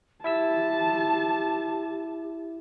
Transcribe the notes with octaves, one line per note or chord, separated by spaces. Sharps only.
E4 G4 E5 A5 E6